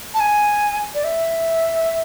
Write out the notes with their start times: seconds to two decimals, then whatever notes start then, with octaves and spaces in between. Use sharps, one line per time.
0.14 A5
0.20 G#5
0.95 D5
1.04 E5